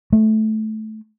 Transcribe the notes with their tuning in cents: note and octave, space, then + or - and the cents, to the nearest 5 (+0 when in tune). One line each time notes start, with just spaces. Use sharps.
A3 -15